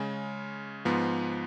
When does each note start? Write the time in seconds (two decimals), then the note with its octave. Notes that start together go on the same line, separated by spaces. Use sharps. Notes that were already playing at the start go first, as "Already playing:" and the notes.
Already playing: C#3 G#3 C#4
0.85 G#2 F3 B3